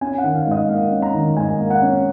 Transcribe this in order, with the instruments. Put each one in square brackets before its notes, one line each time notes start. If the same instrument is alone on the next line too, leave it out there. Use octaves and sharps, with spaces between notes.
[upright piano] C#4 G#5
F#5
D#3
F5
G#2
D#5
A#3 F5
C#4
A#5
D#3
G#2 G#5
A#3
F#5
C#4